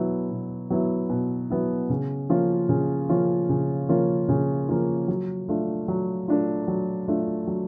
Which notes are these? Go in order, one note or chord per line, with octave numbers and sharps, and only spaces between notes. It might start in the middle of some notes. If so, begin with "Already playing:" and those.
Already playing: B2 F#3 B3 E4
B2
F#3 B3 E4
B2
F#3 B3 E4
C#3
F3 A#3 C#4 F4
C#3
F3 A#3 C#4 F4
C#3
F3 A#3 C#4 F4
C#3
F3 A#3 C#4 F4
F#3
A3 D4 F4
F#3
A3 D4 F4
F#3
A3 D4 F4
F#3